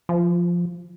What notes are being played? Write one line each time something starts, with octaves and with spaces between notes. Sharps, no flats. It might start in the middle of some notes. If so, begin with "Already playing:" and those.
F3